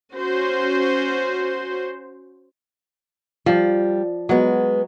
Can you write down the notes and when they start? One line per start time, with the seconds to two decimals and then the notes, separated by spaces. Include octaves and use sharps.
0.14 C#4 F#4 C5
3.46 F3 G3
4.29 F#3 G#3 B3